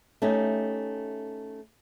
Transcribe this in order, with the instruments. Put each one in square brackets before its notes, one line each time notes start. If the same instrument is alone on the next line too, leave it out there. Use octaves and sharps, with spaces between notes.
[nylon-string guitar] A3 C#4 D#4 G4